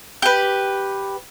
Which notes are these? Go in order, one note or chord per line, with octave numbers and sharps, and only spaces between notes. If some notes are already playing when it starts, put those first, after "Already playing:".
G4 B4